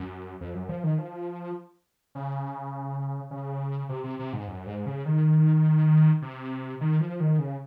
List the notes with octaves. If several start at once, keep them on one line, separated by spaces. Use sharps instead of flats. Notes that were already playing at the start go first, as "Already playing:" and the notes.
Already playing: F#2
F2
F#2
F3
D#3
F3
C#3
C#3
C3
C3
C3
G#2
F#2
G#2
C#3
D#3
C3
D#3
F3
D#3
C#3